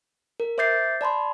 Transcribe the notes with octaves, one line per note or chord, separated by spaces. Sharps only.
A#4
C5 E5 D6 G6 A6 C7
D5 A5 B5 C6